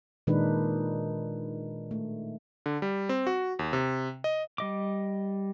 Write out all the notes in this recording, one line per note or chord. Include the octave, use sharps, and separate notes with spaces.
A#2 D#3 G#3 D4 D#4 B4
A3
D3
G3
C4
F#4
D#2
C3
D#5
G3 D#5 D6